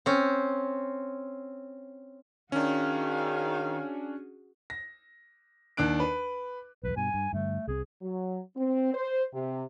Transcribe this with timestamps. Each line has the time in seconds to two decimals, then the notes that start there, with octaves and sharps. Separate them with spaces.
0.06 C4 C#4
2.52 D#3 C#4 D4 F#4 G#4 F5
4.70 A#6
5.77 D#2 D4 F#6 D7
6.00 B4
6.83 B1 E2 B4
6.96 G2 B2 G#5
7.14 G2
7.33 G2 D3 A3
7.67 C2 C4 G#4
8.02 F#3
8.56 C4
8.94 C5
9.33 C3